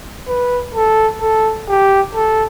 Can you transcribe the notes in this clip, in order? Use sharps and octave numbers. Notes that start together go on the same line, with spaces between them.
B4
A4
A4
G4
A4